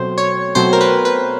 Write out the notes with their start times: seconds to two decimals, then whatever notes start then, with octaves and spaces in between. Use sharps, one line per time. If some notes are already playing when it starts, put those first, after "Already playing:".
Already playing: B2 F#3 A3 C4 C5
0.18 C#5
0.55 B2 F#3 A3 C4 C5
0.73 A#4
0.81 B4
1.05 B4